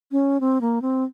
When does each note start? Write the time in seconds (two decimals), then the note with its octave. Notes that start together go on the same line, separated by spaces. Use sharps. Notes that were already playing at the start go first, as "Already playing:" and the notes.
0.12 C#4
0.40 C4
0.61 A#3
0.82 C4